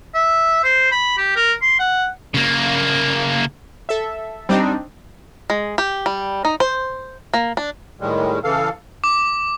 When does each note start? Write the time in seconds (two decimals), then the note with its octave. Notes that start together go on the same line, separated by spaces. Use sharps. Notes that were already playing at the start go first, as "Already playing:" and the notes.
0.14 E5
0.64 C5
0.92 B5
1.18 G4
1.36 A#4
1.62 C6
1.79 F#5
2.34 C#3 A#3
3.89 A4 E5
4.49 G3 C4 D4 D#4
5.50 G#3
5.78 G4
6.06 G3
6.45 D#4
6.60 C5
7.34 A#3
7.57 D4
8.01 A2 D#3 G3 G#3
8.44 C#3 E3 A4 F5
9.04 D6